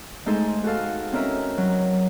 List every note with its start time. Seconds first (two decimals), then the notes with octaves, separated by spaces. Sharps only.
0.26 G#3 A3 D#4 G#4 A4 C5
0.64 F#4 G#4 A4 F5
1.12 C4 C#4 D#4 A#4 E5
1.58 F#3